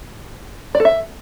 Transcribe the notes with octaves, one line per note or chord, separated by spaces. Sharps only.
D5
A4
E5